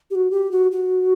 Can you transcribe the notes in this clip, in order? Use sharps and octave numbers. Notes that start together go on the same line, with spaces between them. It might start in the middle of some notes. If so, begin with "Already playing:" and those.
G4
F#4
G4
F#4
F#4